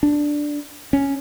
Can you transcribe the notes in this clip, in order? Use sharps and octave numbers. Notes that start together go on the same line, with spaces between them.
D4
C#4